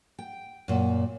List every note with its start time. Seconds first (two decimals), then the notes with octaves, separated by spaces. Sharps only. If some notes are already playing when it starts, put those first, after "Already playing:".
0.19 G5
0.68 F#2 A#2